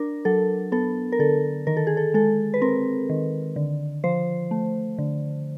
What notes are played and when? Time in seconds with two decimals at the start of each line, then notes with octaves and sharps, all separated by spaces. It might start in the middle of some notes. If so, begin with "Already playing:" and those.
Already playing: D4 A#4
0.25 F#3 A4
0.72 B3 A4
1.12 A#4
1.19 D3 A4
1.67 D#3 A#4
1.77 A4
1.87 G#4
1.97 A4
2.14 G#3 A4
2.54 B4
2.62 C4 A#4
3.09 D#3
3.56 D3
4.04 F3 C5
4.51 A3
4.98 D3